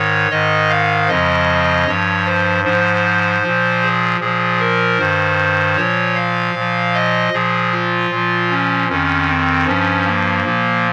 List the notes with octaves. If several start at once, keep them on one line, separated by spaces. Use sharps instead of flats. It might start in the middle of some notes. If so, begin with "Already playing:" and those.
Already playing: G#2 D#3 C#5
G#2 D#3 D#5
F5
F2 C#3 F3 D#5
G2 F3 C#5
C5
G#2 F3 C5
F3
A#2
G#4
A#2 F3 G#4
A#4
G2 D#3 C5
A#2 F3 C#5
F5
A#2 F3
D#5
A#2 F3 G#4
F4
A#2 F3
C#4
F2 D#3 C#4
C4
G2 F3 C#4
A#3
A#2 F3